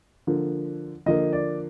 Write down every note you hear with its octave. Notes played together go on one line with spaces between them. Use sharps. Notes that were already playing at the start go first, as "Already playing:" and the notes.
D3 F3 A#3
D3 F3 A#3 D#5
D5